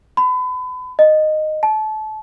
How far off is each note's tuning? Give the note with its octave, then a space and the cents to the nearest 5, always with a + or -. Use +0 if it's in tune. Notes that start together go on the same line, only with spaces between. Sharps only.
B5 +35
D#5 -10
A5 -25